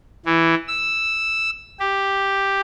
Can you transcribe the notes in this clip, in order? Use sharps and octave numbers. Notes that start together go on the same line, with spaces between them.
E3
E6
G4